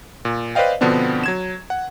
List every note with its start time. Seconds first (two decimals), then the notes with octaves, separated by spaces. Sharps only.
0.25 A#2
0.55 B4 C5 D5 D#5 F5 G5
0.81 B2 D3 F3 B3 C4 D4
1.24 F#3 G#6 E7
1.70 F#5